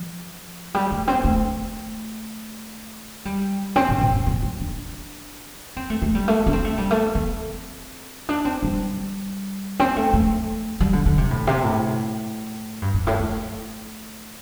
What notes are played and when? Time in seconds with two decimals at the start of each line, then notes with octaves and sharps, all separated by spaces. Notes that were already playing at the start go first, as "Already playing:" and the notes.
Already playing: F3
0.74 G3
0.91 A3
1.08 C4
1.24 A3
3.25 G3
3.76 C4
3.89 A2
4.01 A2
4.14 D3
4.26 C4
4.43 G3
4.60 D4
5.77 C4
5.90 A3
6.02 A3
6.15 G3
6.28 A3
6.46 D4
6.53 C4
6.65 A3
6.78 G3
6.91 A3
7.15 C4
8.29 D4
8.45 C4
8.63 G3
9.79 C4
9.96 A3
10.13 A3
10.80 G3
10.93 D3
11.06 D3
11.18 C3
11.31 A2
11.47 C3
11.64 A2
12.82 G2
12.94 G2
13.07 A2
13.19 A3